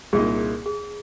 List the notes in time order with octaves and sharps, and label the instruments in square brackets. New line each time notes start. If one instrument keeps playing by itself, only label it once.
[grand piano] C2 A#2 A#3 D#4 [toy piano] G#4
[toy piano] G#4